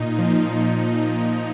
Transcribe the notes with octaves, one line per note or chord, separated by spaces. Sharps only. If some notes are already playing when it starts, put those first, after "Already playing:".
Already playing: A#2 D#4
F3
F3
A#2